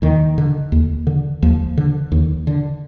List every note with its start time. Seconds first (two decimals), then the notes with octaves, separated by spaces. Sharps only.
0.02 D#2 D#3
0.38 D3
0.72 D#2
1.07 D3
1.43 D#2 F3
1.78 D3
2.12 D#2
2.47 D3